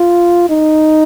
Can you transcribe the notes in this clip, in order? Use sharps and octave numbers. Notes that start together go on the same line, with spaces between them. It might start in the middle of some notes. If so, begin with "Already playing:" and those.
Already playing: F4
D#4